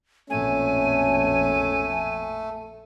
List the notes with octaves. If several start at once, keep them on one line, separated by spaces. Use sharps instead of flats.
A#1 F2 B2 A3 C#4 G#5